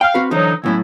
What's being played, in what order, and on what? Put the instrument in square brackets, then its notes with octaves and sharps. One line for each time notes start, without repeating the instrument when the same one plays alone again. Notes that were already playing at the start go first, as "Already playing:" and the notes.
[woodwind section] F5 [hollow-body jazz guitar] G5
[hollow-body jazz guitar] C4 F#4 B4
[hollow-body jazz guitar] D3 E3 C5 [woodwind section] F#3 D#4
[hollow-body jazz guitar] D2 A2 F#3 [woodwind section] B3 C#4 E4